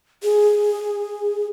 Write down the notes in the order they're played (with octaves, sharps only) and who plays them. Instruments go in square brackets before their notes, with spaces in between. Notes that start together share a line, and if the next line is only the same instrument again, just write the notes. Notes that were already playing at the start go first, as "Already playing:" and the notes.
[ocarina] G#4